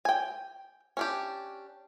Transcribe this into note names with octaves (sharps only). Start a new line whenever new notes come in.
G5 G#5
C#4 D4 G4